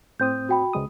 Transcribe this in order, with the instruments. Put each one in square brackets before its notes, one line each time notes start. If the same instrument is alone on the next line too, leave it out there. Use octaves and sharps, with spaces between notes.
[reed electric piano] A2 C4 D#6 [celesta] G6
[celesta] F#4 G5 B5
[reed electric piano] C#2 G#3 D#6